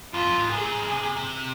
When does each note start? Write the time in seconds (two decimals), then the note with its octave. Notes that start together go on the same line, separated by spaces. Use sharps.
0.13 F2 F4
0.27 F2
0.40 G#2
0.52 C3 G#4
0.61 A#2
0.71 G#2
0.81 F2
0.90 C3
1.03 C3
1.16 C3